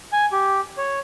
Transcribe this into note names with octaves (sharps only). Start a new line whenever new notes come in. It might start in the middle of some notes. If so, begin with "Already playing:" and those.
G#5
G4
C#5